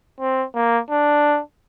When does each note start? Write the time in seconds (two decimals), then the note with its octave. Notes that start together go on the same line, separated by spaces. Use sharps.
0.20 C4
0.55 A#3
0.91 D4